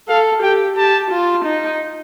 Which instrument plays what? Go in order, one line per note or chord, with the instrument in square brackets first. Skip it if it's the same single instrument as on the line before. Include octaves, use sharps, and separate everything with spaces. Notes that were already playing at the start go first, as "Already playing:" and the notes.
[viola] A4 [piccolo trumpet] F5
[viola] G4 [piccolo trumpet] G5
[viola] G4 [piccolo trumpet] A5
[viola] F4
D#4